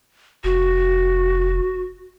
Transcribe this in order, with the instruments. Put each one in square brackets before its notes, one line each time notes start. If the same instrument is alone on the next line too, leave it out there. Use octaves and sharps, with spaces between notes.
[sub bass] F1 [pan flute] F#4